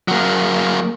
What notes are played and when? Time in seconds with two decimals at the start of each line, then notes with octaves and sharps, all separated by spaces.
0.08 F#3 A#3